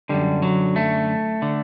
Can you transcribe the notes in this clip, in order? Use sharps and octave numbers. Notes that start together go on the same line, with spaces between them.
F#2 D3 G3
F#3
A3
D3